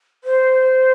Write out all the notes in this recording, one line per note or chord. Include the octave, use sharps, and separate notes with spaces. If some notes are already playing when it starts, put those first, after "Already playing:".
C5